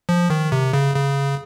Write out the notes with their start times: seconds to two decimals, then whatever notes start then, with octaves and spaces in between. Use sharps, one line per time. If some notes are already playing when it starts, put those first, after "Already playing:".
0.09 F3
0.30 D#3
0.52 C3
0.73 C#3
0.96 C#3